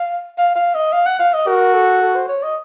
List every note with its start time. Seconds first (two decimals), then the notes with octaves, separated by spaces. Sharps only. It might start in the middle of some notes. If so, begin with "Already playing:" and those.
Already playing: F5
0.38 F5
0.55 F5
0.75 D#5
0.93 F5
1.06 F#5
1.19 F5
1.34 D#5
1.47 F#4 A#4
1.74 A4
2.02 A4
2.15 C5
2.28 C#5
2.43 D#5